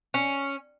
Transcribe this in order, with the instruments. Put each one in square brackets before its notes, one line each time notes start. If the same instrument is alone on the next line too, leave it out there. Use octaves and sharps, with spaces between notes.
[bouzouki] C#4